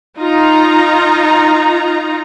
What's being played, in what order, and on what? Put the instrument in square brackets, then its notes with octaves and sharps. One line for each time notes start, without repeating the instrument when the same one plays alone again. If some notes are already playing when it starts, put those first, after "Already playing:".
[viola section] D#4 F4 A#5